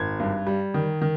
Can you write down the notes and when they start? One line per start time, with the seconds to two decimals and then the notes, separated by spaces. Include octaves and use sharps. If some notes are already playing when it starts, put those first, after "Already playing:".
Already playing: G#1 G#6
0.20 G2
0.46 G3
0.74 D#3
1.02 D#3